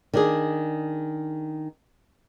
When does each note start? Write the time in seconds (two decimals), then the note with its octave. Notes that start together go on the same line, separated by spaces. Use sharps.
0.13 D#3 D4 G#4